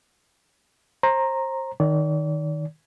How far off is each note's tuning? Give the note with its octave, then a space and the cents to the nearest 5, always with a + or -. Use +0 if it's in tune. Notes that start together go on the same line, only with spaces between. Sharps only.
C5 +25 A#5 +0
D#3 -5 D5 -40